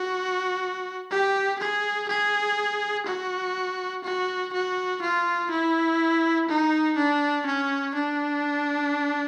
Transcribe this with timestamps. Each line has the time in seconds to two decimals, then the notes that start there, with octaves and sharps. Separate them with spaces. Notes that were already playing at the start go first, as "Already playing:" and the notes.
Already playing: F#4
1.11 G4
1.59 G#4
2.09 G#4
3.06 F#4
4.04 F#4
4.53 F#4
5.02 F4
5.51 E4
6.49 D#4
6.97 D4
7.46 C#4
7.95 D4